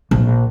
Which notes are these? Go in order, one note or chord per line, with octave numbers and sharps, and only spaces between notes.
A#1